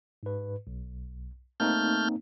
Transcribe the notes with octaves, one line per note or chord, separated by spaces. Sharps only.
G#2 B4
B1
A3 A#3 C4 D#4 F6 G6